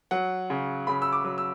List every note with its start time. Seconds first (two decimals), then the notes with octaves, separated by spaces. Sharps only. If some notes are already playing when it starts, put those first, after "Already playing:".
0.11 F#3 F#5
0.50 C#3
0.87 C#3 B5
1.02 E6
1.12 D6
1.24 F#3
1.38 E6